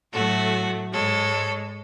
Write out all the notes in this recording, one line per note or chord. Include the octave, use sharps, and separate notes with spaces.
A2 F#3 A3 F#4 A4
G#2 G#3 A4 C#5